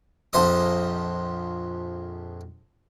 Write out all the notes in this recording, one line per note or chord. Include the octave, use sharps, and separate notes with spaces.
A#1 F2 C5 D#5 D#6